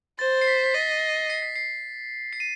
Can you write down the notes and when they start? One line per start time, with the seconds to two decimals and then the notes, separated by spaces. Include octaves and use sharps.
0.19 C5 A6
0.41 C7
0.47 B6
0.66 B6
0.74 D#5 A6
1.30 C7
1.43 B6
1.56 C7
2.33 C7
2.40 D#7